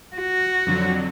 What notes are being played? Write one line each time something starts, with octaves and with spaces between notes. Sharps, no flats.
F#4
F2 D3 F#3